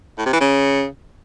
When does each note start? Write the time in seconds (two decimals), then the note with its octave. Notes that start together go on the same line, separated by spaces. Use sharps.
0.18 A2
0.26 C3
0.33 E3
0.40 C#3